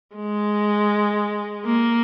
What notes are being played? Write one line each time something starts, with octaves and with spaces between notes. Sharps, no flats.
G#3
A#3